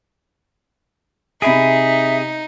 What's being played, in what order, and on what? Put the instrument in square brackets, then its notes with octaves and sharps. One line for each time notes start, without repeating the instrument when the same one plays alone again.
[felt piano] C3 B5 D7 [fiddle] D#4 [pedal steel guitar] G#4 [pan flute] E5